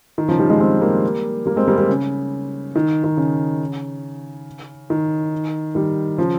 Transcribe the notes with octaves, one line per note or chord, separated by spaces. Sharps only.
D#3
C#3 F3
D#3 G3
F3 G#3
G#3 C4
G3 A#3
G3 A#3
G#3 C4
G3 A#3
G3 A#3
C#3
D#3
D#3
C#3
D#3
D#3 G3
C#3 F3